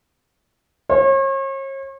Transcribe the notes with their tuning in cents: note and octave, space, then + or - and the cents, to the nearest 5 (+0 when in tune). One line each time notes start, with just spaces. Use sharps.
C#5 -40